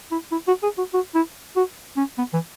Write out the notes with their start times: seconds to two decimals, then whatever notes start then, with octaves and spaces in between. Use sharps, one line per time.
0.11 E4
0.32 E4
0.48 F#4
0.63 G#4
0.78 F#4
0.94 F#4
1.15 E4
1.56 F#4
1.97 C#4
2.18 B3
2.34 E3